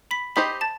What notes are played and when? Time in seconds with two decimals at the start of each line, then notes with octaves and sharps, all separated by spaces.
0.11 B5 B6
0.36 D#4 G4 C5 D#5 B5 B6
0.61 A5 A6